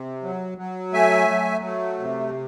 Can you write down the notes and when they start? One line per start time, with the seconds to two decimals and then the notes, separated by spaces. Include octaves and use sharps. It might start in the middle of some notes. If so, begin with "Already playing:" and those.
Already playing: C3
0.23 F#3
0.58 F#3
0.93 A3 E5 G#5
1.29 F#3
1.64 A3
1.99 C3